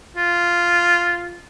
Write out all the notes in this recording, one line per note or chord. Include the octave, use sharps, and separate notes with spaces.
F4